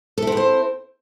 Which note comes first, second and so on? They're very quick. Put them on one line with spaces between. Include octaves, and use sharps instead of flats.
A4 E4 C4 B3 C5